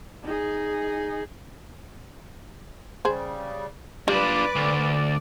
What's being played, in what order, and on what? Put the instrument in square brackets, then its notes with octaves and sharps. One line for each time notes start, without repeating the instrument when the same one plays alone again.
[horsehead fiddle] D#4 G#4
[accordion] C#3 G3 [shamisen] G#4 C5
[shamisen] G3 [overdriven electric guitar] D4 F4 [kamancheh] B4 D6 [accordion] D5
[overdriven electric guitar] D2